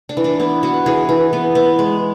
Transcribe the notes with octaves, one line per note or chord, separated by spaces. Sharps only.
D4
E3
D4
B3 E4
B3 F#4
E3 G#4
E3
B3
B3
G#3